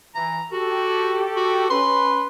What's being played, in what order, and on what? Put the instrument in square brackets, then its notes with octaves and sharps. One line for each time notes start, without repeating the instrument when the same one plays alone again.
[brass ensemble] E3 [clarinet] A#5
[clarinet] F#4 [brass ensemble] G4 A4
[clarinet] F#4
[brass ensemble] C#4 B4 [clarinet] C6